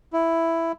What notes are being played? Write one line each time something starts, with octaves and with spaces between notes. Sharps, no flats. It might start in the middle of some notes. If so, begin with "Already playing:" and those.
E4